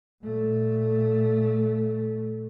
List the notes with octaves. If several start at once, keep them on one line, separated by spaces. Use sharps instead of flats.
A#2 A3